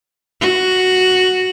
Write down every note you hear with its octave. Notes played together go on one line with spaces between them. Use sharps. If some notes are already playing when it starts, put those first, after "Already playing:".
F#4